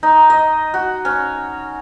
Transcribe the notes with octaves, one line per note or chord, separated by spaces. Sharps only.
D#4
D#5
F#4
C#4